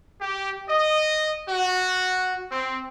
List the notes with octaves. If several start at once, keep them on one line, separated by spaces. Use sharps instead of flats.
G4
D#5
F#4
C4